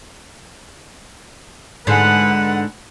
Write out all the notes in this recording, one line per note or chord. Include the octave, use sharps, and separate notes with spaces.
G#2 D3 B4 F#5